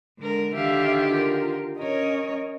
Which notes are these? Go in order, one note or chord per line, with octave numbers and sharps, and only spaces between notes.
D3 G#3 A#4
D3 D#3 G4 E5 F5
F4 A#4
C#4 A#4 C#5 D#5